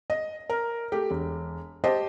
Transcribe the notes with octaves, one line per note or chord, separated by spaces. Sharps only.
D#5
A#4
A3 G4
E1
G4 C5 D#5 A5